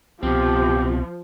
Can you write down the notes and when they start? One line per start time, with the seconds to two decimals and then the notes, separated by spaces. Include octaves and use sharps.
0.23 C2 B2 F3 C4 G4